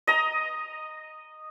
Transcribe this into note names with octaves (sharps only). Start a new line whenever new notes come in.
D#5 A#5